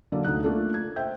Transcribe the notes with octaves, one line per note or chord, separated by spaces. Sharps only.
D3 F#3 A#3 D5 F5
D2 D3 D#4 F#6
A3 A#3 D4 F4 A4
G#6
C5 E5 G5 G6